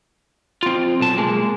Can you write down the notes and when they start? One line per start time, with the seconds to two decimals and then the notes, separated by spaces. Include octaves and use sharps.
0.63 C4 F4
1.00 B1 A5
1.18 G#3 A#3